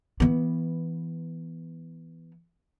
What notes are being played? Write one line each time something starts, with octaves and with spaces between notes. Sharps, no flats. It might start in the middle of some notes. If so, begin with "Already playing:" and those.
E3 B3